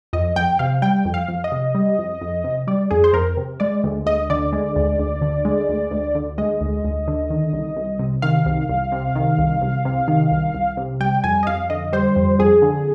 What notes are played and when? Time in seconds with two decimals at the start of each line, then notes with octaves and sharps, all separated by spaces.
0.13 F2 D#5
0.36 F2 G5
0.59 C3 F5
0.82 G3 G5
1.05 F2
1.14 F5
1.28 F2
1.44 D#5
1.52 C3
1.75 G3
1.99 F2
2.21 F2
2.44 C3
2.67 G3 D5
2.91 F2 G#4
3.04 C5
3.13 F2 A#4
3.37 C3
3.60 G#3 D5
3.84 D2
4.06 D2 D#5
4.30 D3 D5
4.53 G#3
4.76 D2
4.99 D2
5.21 D3
5.45 G#3
5.69 D2
5.91 D2
6.15 D3
6.38 G#3 D#5
6.61 D2
6.84 D2
7.08 D3
7.30 D#3
7.53 C2
7.77 C2
7.99 C3
8.22 D#3 F5
8.46 C2
8.69 C2
8.92 C3
9.15 D#3
9.38 C2
9.62 C2
9.85 C3
10.08 D#3
10.31 C2
10.54 C2
10.77 C3
11.00 G3 G5
11.24 F2 G#5
11.43 D#5
11.47 F2 F5
11.70 D3 D#5
11.93 G3 C5
12.16 F2
12.39 F2 G#4
12.62 D3